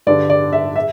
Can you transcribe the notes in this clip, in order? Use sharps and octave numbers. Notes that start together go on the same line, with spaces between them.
G2 D3 G3 D4 D5
D5
E5
E5